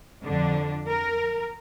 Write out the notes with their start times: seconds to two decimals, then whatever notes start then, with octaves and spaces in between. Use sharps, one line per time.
0.23 F2 D3 D4
0.88 A#4